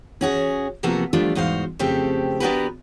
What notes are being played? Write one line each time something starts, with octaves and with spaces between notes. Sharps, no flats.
C#4 F#4 G#4
C3 F3 A#3 B3 F#4 A4
F3 G3 A3 D4 F4
E2 G#2 F#4 C5 F5
F2 C#3 A3 C4 G4 A4
B3 D4 F#4 G4 A#4 B4